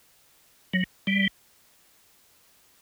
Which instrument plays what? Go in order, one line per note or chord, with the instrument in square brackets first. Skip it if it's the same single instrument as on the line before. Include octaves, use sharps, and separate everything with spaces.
[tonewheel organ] F#3
G3